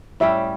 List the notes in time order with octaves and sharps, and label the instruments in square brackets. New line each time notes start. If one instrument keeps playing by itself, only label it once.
[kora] A2 G3 C#4 G4 [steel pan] E5